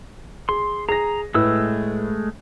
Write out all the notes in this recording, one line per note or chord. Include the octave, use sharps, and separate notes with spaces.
G#4 C6
G#4 A#5 A#6
A2 G#3 A3 B4 E6